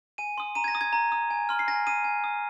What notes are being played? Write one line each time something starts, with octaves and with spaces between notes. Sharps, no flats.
G#5 D#7
C6 D#6
A#5 D#7
G#6
A#6
D#6
G#6
A#5
D#6
G#5
C6 F6
C7
G#5 A#6
D#6 D#7
G#5
D#6